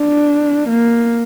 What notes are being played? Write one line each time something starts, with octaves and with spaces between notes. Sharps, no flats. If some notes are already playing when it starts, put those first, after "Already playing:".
Already playing: D4
A#3